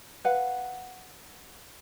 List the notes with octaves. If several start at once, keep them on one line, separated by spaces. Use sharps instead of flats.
B4 F5 F#5